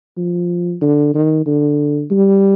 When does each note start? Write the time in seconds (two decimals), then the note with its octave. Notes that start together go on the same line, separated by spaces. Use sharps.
0.17 F3
0.81 D3
1.14 D#3
1.46 D3
2.11 G3